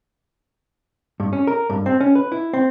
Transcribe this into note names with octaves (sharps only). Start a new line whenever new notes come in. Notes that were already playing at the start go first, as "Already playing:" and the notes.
G2
C#4
A#4
G2
C4
C#4
B4
E4
C4